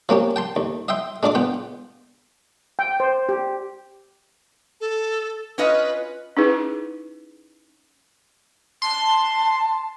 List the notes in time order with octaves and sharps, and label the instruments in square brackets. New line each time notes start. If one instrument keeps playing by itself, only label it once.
[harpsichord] F3 A#3 C#4 G4
G5 A5 C6
D#2
D#5 E5 G5 C6
G#3 D4 F4 D5 D6
B3 F4 G5
[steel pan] G5
C5
G4
[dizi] A4
[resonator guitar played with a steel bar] C#4 F4 D#5 [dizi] B4
[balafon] C#4 D#4 E4 G#4 B4
[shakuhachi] A5 [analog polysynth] C6